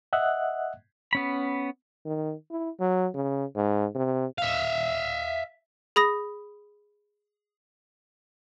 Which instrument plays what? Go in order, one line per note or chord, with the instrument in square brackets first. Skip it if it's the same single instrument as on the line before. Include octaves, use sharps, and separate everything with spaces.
[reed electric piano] D#5 E5 F#5 F#6
[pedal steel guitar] B3 C#4 B5
[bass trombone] D#3
E4
F#3
C#3
G#2
C3
[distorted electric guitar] E5 F5
[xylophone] G#4 B5 D#6 A#6